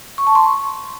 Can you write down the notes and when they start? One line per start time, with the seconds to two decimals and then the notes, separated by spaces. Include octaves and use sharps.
0.18 C#6
0.27 A5
0.35 C6
0.44 C#6